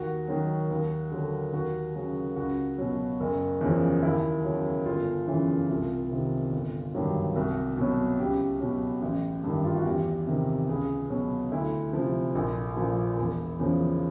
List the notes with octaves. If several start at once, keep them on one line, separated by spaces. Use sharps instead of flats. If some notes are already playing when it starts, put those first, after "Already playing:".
Already playing: D#2 F#4
D#3 F#3
D#2
D3 F#3
D#2 F#4
C#3 F#3
C#2 F#4
B2 F#3
F#1
E2 C#3 F3
D#2 E4
C#3 F#3
G1 F4
F#2 C#3 E3
C2 F4
C3 D#3
G1
G2 D#3 F#3
C2 F#4
B2 F#3
C#2 G4
B2 F#3
A1
G2 D#3
F4
F#4
E2 G4
C3 D#3
C#2 G#4
B2 F#3
D2 E4
C3 F3
A#1
A#2 F3
E1
E2 C#3 F3